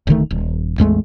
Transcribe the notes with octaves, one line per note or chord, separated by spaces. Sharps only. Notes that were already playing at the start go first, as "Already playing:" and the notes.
D1 D3 D#3 A3
D#1
A1 E2 G#3 A3